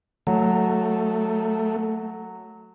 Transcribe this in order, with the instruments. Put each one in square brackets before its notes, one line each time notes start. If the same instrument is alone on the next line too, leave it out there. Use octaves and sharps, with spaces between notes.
[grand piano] F#3 [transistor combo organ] A3